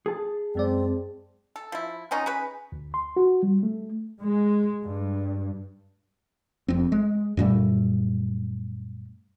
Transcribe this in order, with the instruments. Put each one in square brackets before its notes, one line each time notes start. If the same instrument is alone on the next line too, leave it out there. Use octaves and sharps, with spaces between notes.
[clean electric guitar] G#4 A5
[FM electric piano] F#2 G#3 D5 [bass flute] C4
[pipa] A4
F3 E4
F3 B3 C#4 D#4
C#4 G#4 B4
[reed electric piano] D2
C6
F#4
G3
A3
[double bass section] G#3
G2
[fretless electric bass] F1 F2 C4
G#3
F#2 A#2 G3 A3